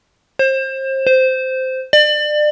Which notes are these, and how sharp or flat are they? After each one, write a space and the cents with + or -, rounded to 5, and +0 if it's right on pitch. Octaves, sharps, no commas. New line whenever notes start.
C5 +30
C5 -10
D5 +30